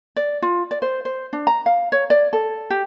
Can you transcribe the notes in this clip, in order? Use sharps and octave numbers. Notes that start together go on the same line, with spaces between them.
D5
F4
D5
C5
C5
D4
A#5
F5
C#5
D5
A4
G4